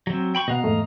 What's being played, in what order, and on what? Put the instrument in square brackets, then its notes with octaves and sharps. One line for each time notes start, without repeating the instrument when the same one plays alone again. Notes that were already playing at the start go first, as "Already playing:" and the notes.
[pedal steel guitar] F#3 C4
G5 B5 C#6
[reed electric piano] B2 F#5 [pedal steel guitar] D#5 F5 A#5
[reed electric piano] E2 G#2 A3